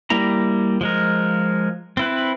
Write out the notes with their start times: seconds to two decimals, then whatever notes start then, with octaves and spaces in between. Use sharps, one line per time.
0.10 G3 A#3 E4 A#5
0.81 F3 G#3 A#4
1.97 C4 E4 B4